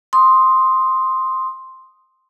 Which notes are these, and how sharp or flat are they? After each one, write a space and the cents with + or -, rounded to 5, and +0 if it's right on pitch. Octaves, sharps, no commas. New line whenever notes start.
C6 +0 D#6 +0